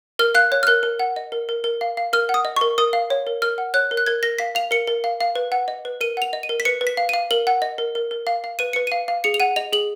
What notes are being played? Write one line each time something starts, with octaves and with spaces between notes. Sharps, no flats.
A#4 F6
F5 F#6
C#5 F#6
F6
A#4 F#6
A#4
F#5
D#5
A#4
A#4
A#4
F5
F5
A#4 F6
F#5
D#6
D#5
A#4 C#6
A#4 D#6
F5
C#5
A#4
A#4 F6
F#5
C#5 F#6
A#4
F#6
A#4 G#6
A#4 A#6
F5 B6
F5 F7
A#4 C#7
A#4
F5
F5
B4
F#5
D#5
B4
A#4 D#7
F#5 F7
D#5
D#7
A#4
B6
B4 C#7
B4
B6
F5
F5 D#7
A#4 F#7
F#5
D#5
A#4
A#4
A#4
F5
F5
B4 D#7
B4 C#7
F5 D#7
F5
G#4 C#7
F7
F#5 D#7
D#5 F7
G#4 F#7